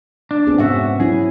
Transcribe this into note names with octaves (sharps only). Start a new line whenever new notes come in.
D4
B3 C4 G#4
G#2 C#4 F#4 E5 F#5
F#3 C#4 E4 G#4